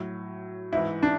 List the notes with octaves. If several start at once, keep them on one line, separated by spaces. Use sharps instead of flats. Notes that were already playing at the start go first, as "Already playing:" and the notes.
Already playing: A2 F#3
G#2 E4
E3
D4